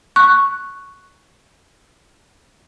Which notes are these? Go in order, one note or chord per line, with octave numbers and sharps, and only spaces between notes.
C#6 F#6